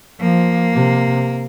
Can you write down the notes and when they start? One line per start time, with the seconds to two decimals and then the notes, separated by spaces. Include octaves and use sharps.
0.21 F3 A#3
0.74 C3